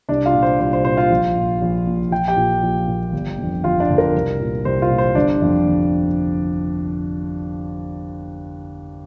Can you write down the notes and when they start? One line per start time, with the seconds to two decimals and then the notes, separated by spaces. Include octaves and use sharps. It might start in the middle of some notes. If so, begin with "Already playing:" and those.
0.09 C2 D4 D5
0.26 F4 F5
0.34 A#2
0.43 C5
0.60 C2 C5
0.73 C5
0.85 A#2 C5
0.97 F4 F5
1.10 A#1
1.36 A#2
1.61 A#1
1.87 A#2
2.11 A#1 G5
2.28 G4 G5
2.37 A#2
2.63 A#1
2.88 A#2
3.13 G1
3.38 F2 D3
3.64 G1 F4 F5
3.80 D4 D5
3.89 F2 D3
3.98 A#4
4.15 C2
4.40 A#2
4.65 C2 C5
4.82 F4 F5
4.91 A#2
4.98 C5
5.15 G1 D4 D5
5.42 F2 D3
5.67 G1